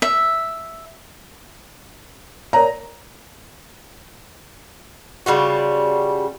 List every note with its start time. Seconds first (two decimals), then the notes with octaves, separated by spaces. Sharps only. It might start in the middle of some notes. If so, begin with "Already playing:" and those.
0.02 E5
2.53 A#4 C#5 D5 A#5
5.26 C#3 G3 F4 F#4